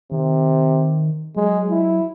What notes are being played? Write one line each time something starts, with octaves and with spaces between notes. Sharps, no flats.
C3 D#3
F#3 G#3
E4